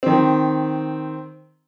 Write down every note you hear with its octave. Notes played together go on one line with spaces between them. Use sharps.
D#3 C4